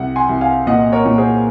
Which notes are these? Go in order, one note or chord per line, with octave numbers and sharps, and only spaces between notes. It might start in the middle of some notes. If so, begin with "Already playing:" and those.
Already playing: C2 F#5
G#5 C6
C2
F5 G#5
A#2 D#5 F#5
A#4 C#5
A#2
G#4 C5